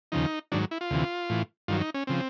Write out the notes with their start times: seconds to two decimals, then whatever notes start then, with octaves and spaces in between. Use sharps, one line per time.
0.12 D#2 C#3 F3 D#4
0.52 G#2 D#3 F#3 D4
0.71 E4
0.81 F4
0.90 D2 C3 E3
1.29 A2 E3
1.68 G2 D#3 F#3 F4
1.81 D#4
1.94 C#4
2.07 C#3 F3 C4